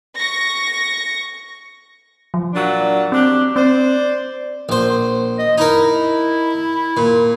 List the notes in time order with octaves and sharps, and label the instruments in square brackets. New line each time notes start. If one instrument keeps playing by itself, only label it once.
[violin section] C#6 A#6
[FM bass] F3
[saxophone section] A#2 F#3 D4
[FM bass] C4 [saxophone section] D4 G4
[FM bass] C4 [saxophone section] C5 D5
[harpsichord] A#1 C5
[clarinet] D#5
[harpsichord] D#4 A#4 [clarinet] E4
[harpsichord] A#2